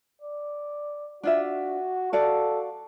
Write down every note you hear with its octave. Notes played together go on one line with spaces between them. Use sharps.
D5
D4 F4 F#4 E5
F#4 A4 D5 F5